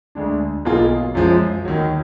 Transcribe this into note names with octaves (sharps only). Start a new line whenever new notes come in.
D2 D3 G#3 D4
B1 B2 A#3 F4 G#4
F#2 F3 G#3
D#2 D#3 F#3